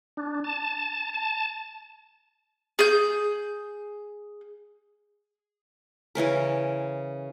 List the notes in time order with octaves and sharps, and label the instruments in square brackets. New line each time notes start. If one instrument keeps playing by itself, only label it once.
[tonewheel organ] D4
A5
A5
[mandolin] G#4 G6
[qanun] C#3 E3 C#4 A#4